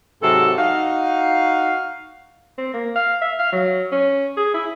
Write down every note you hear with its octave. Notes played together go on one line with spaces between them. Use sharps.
G#2 C3 F#3 A4
D#4 F#4 F5
C4
A#3
F5
E5
F5
F#3
C#4
G#4
E4